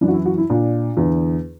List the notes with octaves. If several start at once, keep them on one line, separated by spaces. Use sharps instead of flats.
F#2 E3 D4
F#4
E4
F#4
E4
A#2 D4
E2 D3